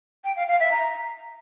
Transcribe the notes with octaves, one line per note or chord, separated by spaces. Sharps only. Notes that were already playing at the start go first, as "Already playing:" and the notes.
G5
F5
F5
E5
A#5